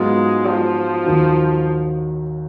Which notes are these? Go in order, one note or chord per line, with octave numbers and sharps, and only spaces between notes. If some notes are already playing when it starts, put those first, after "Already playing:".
Already playing: G#2 F#3 G#3 B3 F4
F3
D#2 D#3 F#3